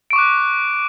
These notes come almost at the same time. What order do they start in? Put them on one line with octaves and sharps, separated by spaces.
D7 C#6 D6 F#6